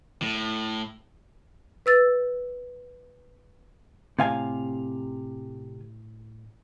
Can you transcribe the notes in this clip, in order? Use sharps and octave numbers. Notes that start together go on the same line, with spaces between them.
A2
B4 E6 A6
A2 C3 F5 G#5